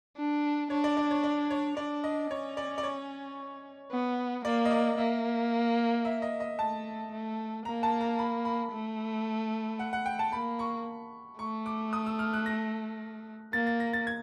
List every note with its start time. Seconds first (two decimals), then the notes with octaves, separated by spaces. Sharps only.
0.17 D4
0.70 D4 C#5
0.84 D5
0.97 D5
1.11 C#5
1.23 D5
1.50 C#5
1.77 D4 D5
2.04 D#5
2.31 C#4 C#5
2.57 D5
2.78 D5
2.83 C#5
3.91 B3
4.45 A#3 D5
4.65 D#5
4.71 D5
4.98 A#3 E5
6.05 E5
6.22 D#5
6.40 D#5
6.59 A3 A5
7.11 A3
7.65 A#3 A#5
7.83 A5
8.01 A#5
8.19 B5
8.45 B5
8.72 A3
9.79 F#5
9.93 F#5
10.06 G5
10.19 A5
10.32 A#3 B5
10.59 C#6
11.39 A3 C#6
11.66 D6
11.93 D#6
12.06 E6
12.19 F6
12.33 F#6
12.46 A#6
13.53 A#3 A6
13.67 A6
13.80 A#6
13.93 A6
14.07 G#6